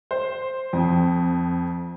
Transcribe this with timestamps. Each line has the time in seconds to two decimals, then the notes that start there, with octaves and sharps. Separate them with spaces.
0.11 C5
0.73 F2